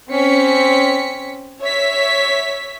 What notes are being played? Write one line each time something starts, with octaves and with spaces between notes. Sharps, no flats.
C4 C#4 B6 C#7
C#5 E5 B6